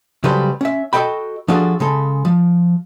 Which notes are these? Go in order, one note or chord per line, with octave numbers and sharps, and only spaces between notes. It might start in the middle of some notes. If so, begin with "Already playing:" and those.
C#3 F#3 G3 A4 B4 C5
C#4 E5
F#4 A4 D#5 G5 B5
F3 D4 F4 F#4 G#4 A4
C#3 G#3 A4
F3